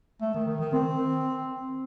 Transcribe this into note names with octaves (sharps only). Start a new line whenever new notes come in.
A3
D#3
D#3
D#3
C4